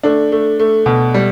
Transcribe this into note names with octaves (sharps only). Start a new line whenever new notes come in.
A3 D4
A3
A3
B2
G3